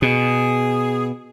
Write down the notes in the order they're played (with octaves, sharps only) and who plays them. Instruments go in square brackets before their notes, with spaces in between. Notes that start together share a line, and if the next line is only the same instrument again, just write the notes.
[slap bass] B2 [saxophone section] G#4